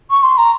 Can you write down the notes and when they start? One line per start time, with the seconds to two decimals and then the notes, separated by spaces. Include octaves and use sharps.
0.10 C#6
0.23 C6
0.37 A#5